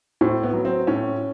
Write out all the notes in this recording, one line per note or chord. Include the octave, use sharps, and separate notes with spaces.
A2 C4
B3
F#3
C4
A2 C#4